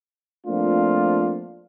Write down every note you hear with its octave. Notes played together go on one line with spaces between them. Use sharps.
F3 A3 A#3 C4 D4 F4